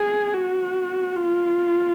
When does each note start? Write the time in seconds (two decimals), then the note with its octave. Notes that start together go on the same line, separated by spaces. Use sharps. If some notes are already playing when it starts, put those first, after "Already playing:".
Already playing: G#4
0.34 F#4
1.15 F4